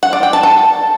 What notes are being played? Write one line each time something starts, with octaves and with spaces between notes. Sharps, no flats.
F#5
D5
G5
A5
A4